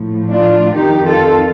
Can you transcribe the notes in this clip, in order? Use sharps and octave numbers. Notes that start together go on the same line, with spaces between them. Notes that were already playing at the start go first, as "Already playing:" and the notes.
Already playing: A2 F3
D4 F4
F2 D#3 D#4 G4
F4 A4